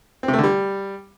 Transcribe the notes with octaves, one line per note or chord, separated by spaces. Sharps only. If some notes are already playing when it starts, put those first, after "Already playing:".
C4
C3
A3
D3
G3